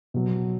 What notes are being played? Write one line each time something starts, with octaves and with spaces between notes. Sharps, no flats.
B2 F#3